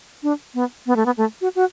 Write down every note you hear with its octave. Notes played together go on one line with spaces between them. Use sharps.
D4
B3
B3
A3
B3
A3
F#4
F#4